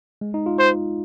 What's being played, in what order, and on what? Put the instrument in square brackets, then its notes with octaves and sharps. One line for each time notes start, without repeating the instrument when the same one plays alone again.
[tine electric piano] G#3
D#4
F4
[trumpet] C5